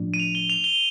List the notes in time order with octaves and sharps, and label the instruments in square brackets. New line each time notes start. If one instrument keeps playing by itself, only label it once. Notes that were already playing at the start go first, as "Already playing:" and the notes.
Already playing: [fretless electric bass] A2 F3 D4
[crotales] D#7
F7
G7
F7
G7